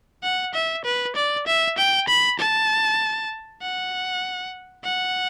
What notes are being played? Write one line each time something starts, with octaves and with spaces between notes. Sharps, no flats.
F#5
E5
B4
D5
E5
G5
B5
A5
F#5
F#5